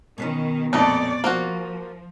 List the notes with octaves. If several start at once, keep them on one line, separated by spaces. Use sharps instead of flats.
B2 D#3 B3 C#4
F2 A#2 A3 D#4 C#5 D5
F3 A#3 F4 F#4 C5